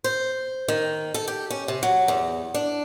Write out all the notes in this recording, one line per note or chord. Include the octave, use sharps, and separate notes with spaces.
C5
D#3
A4
G4
C#4
C3
F#3
E2
D4